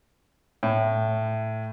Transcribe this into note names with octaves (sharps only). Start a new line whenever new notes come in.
A2